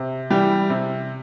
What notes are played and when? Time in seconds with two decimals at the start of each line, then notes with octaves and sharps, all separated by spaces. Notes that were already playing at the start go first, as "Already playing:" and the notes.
Already playing: C3
0.30 E3 G3 G4
0.70 C3